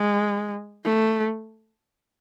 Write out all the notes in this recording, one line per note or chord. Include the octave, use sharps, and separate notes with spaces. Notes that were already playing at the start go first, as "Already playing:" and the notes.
Already playing: G#3
A3